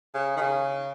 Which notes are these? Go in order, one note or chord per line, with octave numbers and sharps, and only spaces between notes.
C#3
D#3
C#3